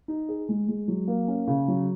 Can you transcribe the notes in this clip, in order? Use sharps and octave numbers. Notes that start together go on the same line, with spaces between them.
D#4
G#4
G#3
G#3
F#3
A#3
C#4
C#3
F#3